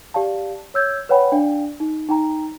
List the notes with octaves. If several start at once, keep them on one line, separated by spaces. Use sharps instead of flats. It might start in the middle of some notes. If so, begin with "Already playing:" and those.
G4 D5 F5 A5
C#5 E6 G6 G#6
B4 C#5 F#5 G5 B5
D4 D5 F5 G5
D#4
D#4 G5 A#5